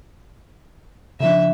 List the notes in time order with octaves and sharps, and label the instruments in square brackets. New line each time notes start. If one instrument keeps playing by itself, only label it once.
[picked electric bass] C#3 F3 D4 [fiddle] E5